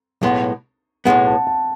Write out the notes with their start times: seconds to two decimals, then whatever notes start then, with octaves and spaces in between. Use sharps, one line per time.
0.22 B1 A2 G#3 B3
1.05 B1 A2 G#3 B3 F#5
1.26 A5
1.47 A5